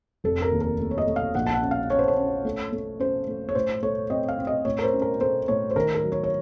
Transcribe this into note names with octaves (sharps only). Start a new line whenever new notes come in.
F1 A4
A#4
D#2
A#4
A3
C#5
D#5
A3
F5
A#1 F#5
A5
F#5
C#4
F5
C#4 C#5
C5
C#5
C#4
A3
A3
C#4 C5
A3
C#5
A2 C5
A3 C#5
C4 D#5
F5
C4
D#5
A2 C#5
A#4
C5
C#4
A#4
A3 C5
A2 C#5
C5
D#3 A#4
A#4
F#3
C#5
C#5